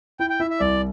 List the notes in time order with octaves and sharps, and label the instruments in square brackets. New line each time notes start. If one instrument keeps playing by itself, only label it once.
[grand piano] E4 [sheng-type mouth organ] G5
[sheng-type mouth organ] G5
[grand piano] E4 [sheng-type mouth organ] E5
[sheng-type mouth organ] E5
[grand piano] C2 [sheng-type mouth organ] D5